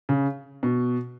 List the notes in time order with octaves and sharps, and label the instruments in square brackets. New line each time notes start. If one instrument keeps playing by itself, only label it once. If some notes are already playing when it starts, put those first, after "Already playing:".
[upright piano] C#3
B2